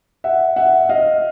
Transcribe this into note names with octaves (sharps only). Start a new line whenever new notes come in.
E5 F#5
E5 F#5
D#5 F5